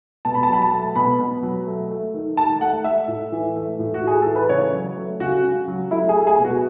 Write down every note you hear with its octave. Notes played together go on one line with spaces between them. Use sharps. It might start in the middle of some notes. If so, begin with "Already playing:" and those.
B2 A5
B5
A5
F#3 B5
A5
A3
B2 B5
B2
F#3
A3
A3
D#3
D#3 A5
A3 F#5
A3 E5
A2
E3
A3
A2
F#4
A2 G#4
E3 A4
B4
C#3 C#5
F#3
A3
C#3 F#4
C#3
F#3
A3 E4
G#4
A3
G#4
B2
F#4